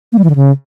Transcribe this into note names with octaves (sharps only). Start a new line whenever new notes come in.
A#3
G3
E3
D3
C#3